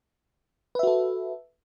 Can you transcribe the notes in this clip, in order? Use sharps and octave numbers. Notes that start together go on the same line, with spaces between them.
F#4 A4 B4 E5